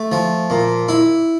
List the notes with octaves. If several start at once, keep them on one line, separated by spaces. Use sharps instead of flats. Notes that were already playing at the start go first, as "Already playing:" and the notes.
Already playing: A3
F3
A#2
E4